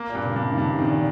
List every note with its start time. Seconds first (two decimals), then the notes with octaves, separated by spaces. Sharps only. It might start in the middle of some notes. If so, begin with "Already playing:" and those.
Already playing: A#3
0.10 A#2
0.15 G2
0.25 C#3
0.36 G2
0.42 C3
0.52 D#3
0.57 G2 C#3
0.74 C3
0.79 D#3
0.89 A#2